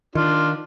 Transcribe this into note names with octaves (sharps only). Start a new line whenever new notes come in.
D#3 D4 F4